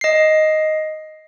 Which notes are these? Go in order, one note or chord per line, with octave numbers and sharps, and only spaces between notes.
D#5 C7